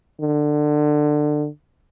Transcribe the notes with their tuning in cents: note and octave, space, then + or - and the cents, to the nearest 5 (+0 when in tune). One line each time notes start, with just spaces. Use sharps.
D3 +20